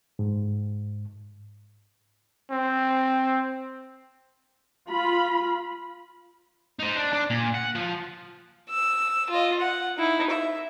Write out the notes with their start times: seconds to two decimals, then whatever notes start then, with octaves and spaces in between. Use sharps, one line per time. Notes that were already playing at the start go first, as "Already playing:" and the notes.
0.19 G#2
2.51 C4
4.89 F4 B5
6.79 D#4 C5
6.97 D4
7.13 D4
7.30 A#2
7.54 F#5
7.75 F3
8.70 E6
9.30 F4 D#5
9.60 F#5
9.98 D#4 E4
10.30 E5